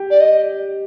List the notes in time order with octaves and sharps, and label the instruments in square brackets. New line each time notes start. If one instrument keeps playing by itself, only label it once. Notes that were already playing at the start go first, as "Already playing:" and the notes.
Already playing: [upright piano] G4
[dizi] D5
D#5